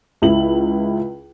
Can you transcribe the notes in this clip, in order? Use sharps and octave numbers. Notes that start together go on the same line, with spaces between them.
C#2 E4 F#7